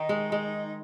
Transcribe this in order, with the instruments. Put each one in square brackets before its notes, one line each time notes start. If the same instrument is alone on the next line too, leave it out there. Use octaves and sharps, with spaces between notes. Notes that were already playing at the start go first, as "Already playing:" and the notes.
Already playing: [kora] D#3 [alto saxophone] D#4
[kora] G#3
G#3